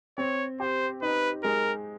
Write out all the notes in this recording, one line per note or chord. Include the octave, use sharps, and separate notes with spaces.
C4 C#5
G4 C5
D#4 B4
G#3 A#4